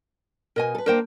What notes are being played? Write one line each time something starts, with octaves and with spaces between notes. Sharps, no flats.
B2 A#4 D#5 G#5
A4 B4
A#3 D4 A#4 C5 G5